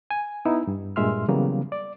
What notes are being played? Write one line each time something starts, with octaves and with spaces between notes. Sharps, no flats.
G#5
B3 D#4 E4
G2
G2 A#2 G#3 E5 C6 F6
C#3 E3 F#3 G3 A#3 B3
D5